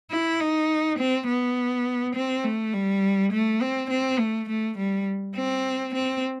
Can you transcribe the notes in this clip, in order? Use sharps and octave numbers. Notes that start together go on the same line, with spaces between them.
E4
D#4
C4
B3
C4
A3
G3
A3
C4
C4
A3
A3
G3
C4
C4